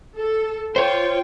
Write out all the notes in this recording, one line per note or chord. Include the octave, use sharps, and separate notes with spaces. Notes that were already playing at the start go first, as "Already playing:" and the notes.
A4
F4 C5 C#5 G5